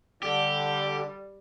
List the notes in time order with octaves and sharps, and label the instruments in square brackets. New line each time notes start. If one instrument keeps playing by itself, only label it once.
[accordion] D3 [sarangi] G3 [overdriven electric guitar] G4